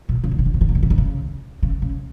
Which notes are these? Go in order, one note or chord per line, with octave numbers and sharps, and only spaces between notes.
A#2
C#3
D3
C#3
D3
C#3
D3
C#3
D3
C#3
D3
C#3
C#3
C#3